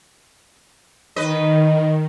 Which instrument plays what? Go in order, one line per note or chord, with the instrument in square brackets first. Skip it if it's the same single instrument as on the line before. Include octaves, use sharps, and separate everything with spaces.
[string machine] D#3 [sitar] B4 D#5